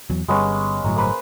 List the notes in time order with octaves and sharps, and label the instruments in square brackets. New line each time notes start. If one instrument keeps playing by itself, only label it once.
[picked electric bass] E2 F#3
[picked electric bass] G1 G3 [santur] G#3 B3 C#4
[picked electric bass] G1 A2 F#3 [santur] A#5
[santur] A#3 B4 C5